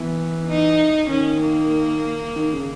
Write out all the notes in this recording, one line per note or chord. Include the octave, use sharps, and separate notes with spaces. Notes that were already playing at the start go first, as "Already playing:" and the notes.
Already playing: E3 B3
D#4
D#3 C#4
A#3
D#3
C#3